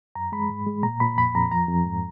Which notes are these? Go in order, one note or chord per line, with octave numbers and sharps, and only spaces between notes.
F#2 A#5
G#3 B5
G#2
G#3
A#2 A#5
A#2 B5
F2 B5
F2 A#5
F3 A#5
F2
G#2